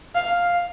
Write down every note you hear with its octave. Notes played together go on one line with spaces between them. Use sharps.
F5